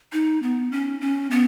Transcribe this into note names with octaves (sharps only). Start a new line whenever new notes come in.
D#4
B3
C#4
C#4
B3